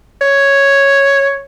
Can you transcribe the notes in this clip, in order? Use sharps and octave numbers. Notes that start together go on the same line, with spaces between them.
C#5